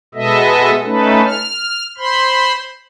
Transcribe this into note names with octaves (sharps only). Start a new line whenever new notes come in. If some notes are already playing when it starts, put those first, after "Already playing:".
B2 G#3 B3 A4 D#5 E5
A3 C#4 D#4 A4 B4
F6
C5 B5 C6